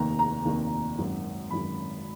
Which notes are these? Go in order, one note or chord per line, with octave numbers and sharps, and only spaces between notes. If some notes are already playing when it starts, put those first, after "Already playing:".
Already playing: F1 D#2 D#3 A#5
A#5
F1 D#2 D#3
G#1 F#2 D#3
G#1 F#2 D#3 B5